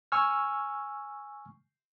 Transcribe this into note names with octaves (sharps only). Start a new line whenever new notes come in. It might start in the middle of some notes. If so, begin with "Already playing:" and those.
G#5 C#6 E6 F6